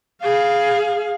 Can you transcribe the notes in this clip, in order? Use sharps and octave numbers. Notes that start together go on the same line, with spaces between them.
G#4 F5